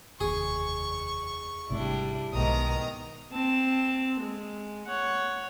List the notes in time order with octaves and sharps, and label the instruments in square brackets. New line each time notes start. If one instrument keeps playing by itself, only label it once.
[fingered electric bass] F1 D#2 [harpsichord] G#4 [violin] C#6
[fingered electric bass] G#1 C3 A3 [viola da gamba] G3 D4 E4
[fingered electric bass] B1 [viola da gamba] G#2 B2 D#3 [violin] A#5 D#6
[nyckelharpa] C4 A5
G#3
C#5 F#5